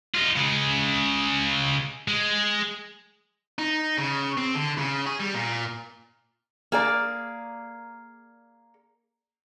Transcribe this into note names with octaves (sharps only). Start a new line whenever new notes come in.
D#4 F4
C#3 G#3
G#3
D#4
C#3
C4
D3
C#3
G#4
G3
A#2
A#3 G#4 D5